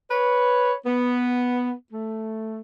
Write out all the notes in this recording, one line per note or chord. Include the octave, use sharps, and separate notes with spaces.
B4 C#5
B3
A3